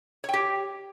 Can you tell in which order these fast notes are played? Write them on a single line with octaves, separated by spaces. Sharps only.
C#5 G5 G4